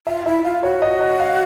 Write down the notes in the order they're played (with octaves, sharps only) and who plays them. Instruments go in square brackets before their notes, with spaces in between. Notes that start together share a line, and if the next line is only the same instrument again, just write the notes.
[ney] F4 [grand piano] E5
[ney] E4 [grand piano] E5
[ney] F4 [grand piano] F5
[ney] F#4 [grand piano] C#5
[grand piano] D#5
D#5
F5